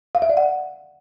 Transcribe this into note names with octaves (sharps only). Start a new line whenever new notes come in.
F5
E5
D5
F#5